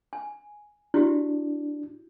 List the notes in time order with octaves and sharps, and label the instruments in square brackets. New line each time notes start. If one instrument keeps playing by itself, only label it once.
[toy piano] G#5
[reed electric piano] D4 [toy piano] E4 F#4 G4